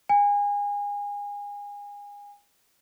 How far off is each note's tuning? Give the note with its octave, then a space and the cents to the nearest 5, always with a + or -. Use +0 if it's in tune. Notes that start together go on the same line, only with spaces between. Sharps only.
G#5 -30